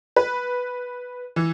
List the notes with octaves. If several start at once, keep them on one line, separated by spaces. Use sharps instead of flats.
B4
E3